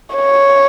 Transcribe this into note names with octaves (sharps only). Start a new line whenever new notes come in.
C#5